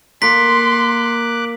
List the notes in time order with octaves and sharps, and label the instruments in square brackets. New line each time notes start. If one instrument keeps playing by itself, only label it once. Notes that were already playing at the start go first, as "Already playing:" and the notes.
[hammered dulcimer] A#3 A#4 [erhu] C6 [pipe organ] D6 F#6 [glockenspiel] B6